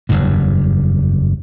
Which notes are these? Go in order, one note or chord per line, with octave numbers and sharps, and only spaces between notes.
F#1 E2 G2